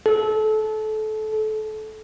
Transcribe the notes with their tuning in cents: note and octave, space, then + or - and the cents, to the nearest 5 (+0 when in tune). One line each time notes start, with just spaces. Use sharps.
A4 -25